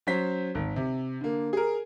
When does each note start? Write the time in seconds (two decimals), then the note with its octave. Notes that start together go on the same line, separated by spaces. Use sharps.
0.07 F#3 C#4 C5 B6
0.55 G#1
0.76 C3
1.21 D3 A#3
1.53 G#4 A#4